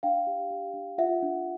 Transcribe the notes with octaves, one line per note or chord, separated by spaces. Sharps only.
D4 F5 G5
G4
G4
D4
F4 E5 F#5
D4